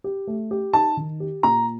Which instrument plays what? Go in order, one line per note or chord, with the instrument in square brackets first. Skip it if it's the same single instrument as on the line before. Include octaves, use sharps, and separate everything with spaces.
[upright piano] G4
A3
G4
[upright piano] D#4 [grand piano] A5
[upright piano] D#3
G4
[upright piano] A#2 [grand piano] A#5